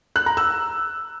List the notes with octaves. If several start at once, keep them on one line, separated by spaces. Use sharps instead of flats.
F#6
A#5
E6